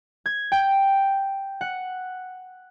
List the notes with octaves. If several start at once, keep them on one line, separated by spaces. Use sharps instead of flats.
G#6
G5
F#5